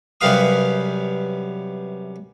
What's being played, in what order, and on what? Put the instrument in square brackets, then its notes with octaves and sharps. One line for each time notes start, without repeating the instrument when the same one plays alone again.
[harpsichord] F#2 C3 G3 B4 F5 D#6